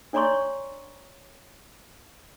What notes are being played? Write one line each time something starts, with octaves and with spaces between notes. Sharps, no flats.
D4 C#5 D5 A#5 C6 C#6